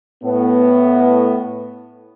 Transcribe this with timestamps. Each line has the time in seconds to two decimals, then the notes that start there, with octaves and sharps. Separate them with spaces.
0.24 A2 B3